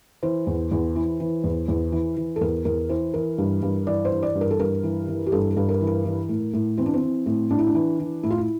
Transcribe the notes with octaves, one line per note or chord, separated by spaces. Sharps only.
E3 C5
E2
E2
E3
E3
E2
E2
E3
E3
A4
E2 A#4
E2 A#4
E3 C5
E3 A#4
G2
G2
E3 D5
C5
E3
D5
G2
A#4
A4
G2 A#4
E3
E3
G4
G2 A4
A4
G2
A#4
E3
A#4
E3
A2
A2
E3 C4
D4
C4
E3
A2
A2 D4
E4
D4
E3
E3
A2 E4
F4
E4